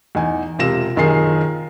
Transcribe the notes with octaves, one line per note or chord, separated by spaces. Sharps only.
E2 D#4 G#5
E1 C3 F4 A#6 E7
F#1 D#3 F4 G#4 C7